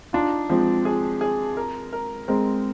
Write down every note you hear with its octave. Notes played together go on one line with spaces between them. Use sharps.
D4 D#4 F4
F3 G#3 C4
G#4
G#4
A#4
A#4
G#3 C4 A#4